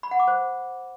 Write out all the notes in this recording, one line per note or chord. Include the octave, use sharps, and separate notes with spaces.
B5
F#5
D6
C5